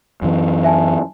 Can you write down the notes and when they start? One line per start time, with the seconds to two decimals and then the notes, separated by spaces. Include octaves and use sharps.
0.22 F#2 E3
0.64 E5 G#5 A5